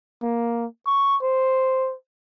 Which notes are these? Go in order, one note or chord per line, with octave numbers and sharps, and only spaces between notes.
A#3
C#6
C5